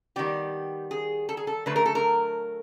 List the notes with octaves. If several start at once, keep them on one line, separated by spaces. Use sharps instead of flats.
D#3 G3 B3 G4
G#4
A4
G#4
A4
D3 F#3 A3 B4
A#4
A4
A#4